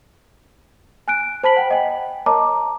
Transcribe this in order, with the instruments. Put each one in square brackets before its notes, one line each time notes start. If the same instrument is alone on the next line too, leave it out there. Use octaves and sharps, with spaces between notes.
[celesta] G#5 F#6 D7
C5 A5 B5 B6 F#7
F#5 G5
D#5 G5 G#5
A#4 C#5 D#5 A5 A#5 D6